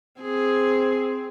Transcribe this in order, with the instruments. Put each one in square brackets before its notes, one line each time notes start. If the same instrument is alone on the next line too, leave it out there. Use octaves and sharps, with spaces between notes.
[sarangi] C4 [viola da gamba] G#4